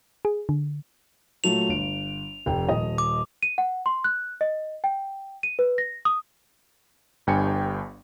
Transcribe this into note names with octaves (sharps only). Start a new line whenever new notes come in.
G#4
D3
A#2 F#3 A3 F7
G1 D7
F1 G5
D#1 D#5
D6
D#7
F#5
C6
F#6
D#5
G5
D#7
B4
A#6
D#6
G1 G2 G5 G#5 C#7